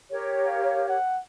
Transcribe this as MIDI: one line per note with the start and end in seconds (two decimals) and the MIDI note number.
0.11 0.97 67
0.11 0.97 70
0.11 0.97 73
0.46 0.88 77
0.89 1.20 78